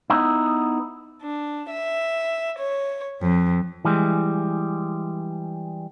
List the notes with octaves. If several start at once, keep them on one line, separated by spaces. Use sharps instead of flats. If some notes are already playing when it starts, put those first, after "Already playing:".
B3 D#4 E4
D4
E5
C#5
F2
E3 G3 G#3